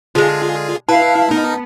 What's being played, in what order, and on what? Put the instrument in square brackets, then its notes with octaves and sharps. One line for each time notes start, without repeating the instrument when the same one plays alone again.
[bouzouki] D3 G#3 [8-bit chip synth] F4 G#4
[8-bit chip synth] E4 [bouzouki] B4 [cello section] F5 [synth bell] A5
[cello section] B3 [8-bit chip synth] D#4 [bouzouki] A#4